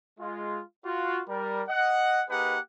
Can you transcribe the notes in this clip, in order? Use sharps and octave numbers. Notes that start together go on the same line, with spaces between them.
G#3 F4
F4 F#4
G3 A#4
D#5 F#5
A#3 D#4 G4 G#4 B4 F#5